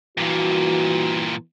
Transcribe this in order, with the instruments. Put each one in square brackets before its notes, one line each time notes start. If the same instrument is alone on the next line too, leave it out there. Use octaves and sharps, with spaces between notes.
[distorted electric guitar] G2 A#2 [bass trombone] E3 [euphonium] F#4